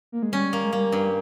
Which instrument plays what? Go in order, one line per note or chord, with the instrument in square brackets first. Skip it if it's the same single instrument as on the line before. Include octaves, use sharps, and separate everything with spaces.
[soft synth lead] A#3
G#3
[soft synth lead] G3 [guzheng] C#4
[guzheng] A#3
[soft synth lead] G#3
[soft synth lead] G3 [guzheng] A#3
[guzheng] G2